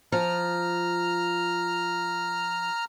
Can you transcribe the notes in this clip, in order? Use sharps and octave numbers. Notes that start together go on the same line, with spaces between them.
F3 A#5 F6